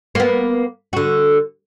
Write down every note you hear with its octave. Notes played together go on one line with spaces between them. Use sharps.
A#3 B3
D3 F#4